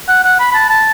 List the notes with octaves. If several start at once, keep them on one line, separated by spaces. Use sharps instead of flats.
F#5
F#5
B5
B5
A5
A5